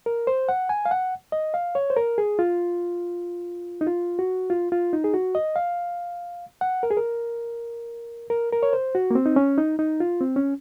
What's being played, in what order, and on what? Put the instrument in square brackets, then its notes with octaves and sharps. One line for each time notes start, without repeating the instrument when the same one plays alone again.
[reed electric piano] A#4
C5
F#5
G#5
F5
F#5
D#5
F5
C#5
C5
A#4
G#4
F4
D#4
F4
F#4
F4
F4
D#4
G#4
F#4
D#5
F5
F#5
A#4
G#4
A#4
A#4
A#4
C#5
C5
F#4
A#3
C4
D#4
C#4
D#4
D#4
F4
C4
C#4